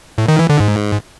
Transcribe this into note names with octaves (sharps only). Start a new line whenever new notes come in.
A2
D#3
E3
D3
G#2